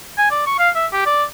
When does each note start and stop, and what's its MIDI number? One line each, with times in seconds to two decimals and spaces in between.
0.18 0.27 80
0.31 0.45 74
0.46 0.56 85
0.58 0.70 77
0.76 0.86 76
0.93 1.02 67
1.06 1.24 74